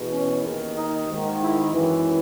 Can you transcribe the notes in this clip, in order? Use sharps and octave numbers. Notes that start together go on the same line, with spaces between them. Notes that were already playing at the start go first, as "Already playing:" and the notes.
Already playing: E2 B2
C#4
D#2 D#3
D#4
G#1 G#2 D#3
E4
G#1 F#2 E3